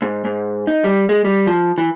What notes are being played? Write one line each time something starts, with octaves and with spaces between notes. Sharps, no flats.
G#2
G#2
D#4
G3
G#3
G3
F3
E3